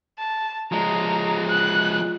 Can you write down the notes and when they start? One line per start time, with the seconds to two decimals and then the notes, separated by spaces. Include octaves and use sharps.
0.19 A5
0.72 F3 G#3 A#5
1.49 F#6